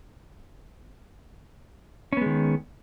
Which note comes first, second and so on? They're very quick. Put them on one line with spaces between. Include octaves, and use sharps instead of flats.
C#4 B3 G#3 D#3